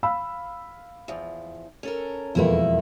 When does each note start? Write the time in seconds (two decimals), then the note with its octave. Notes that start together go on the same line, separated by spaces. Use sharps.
0.03 F5 B5 E6
1.08 E2 F3
1.83 C#4 A4 A#4
2.35 E1 F2 A3 A#3 E4 B4